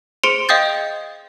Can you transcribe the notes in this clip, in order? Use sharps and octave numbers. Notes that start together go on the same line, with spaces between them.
G#4 C5 C6 C#7 D7 F7
D#5 F5 G5 D#6 G6 A6